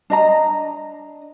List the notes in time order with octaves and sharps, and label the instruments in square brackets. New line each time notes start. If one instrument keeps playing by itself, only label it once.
[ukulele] D4 D#5 A#5